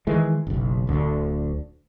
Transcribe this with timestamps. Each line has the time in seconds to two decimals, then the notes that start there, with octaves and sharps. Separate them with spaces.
0.07 D#3 E3 G#3
0.47 F#1 B1
0.87 D1 D2 D3